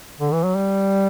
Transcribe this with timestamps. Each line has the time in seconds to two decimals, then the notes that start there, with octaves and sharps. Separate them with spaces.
0.20 D3
0.33 E3
0.44 F#3
0.55 G3